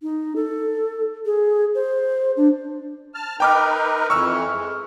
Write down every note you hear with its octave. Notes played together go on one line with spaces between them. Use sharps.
D#4
A4
G#4
C5
D4
A5 F6
D#4 A#4 B4 G5 D6 F6
F2 E3 C#6 E6 F6
G#3